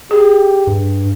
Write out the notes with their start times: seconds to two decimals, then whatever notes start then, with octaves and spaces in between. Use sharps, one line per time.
0.11 G4 G#4
0.67 G2